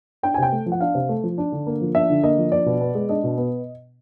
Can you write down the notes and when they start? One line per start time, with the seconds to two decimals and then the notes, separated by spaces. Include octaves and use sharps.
0.23 D4 G5
0.34 G#5
0.38 C3 G5
0.52 A3
0.66 F3
0.72 F#5
0.80 D4 F5
0.95 C3
1.09 A3
1.24 F3
1.38 D4
1.52 D3
1.67 A#3
1.81 F3
1.95 D4 E5
2.10 D3
2.23 A#3 D#5
2.38 F3
2.52 D4 D5
2.66 B2
2.81 B3
2.95 G#3
3.09 D4 D#5
3.24 B2
3.37 B3